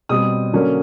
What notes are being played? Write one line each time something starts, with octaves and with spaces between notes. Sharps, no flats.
B2 G3 C4 D#6
D3 F#3 A#3 C#4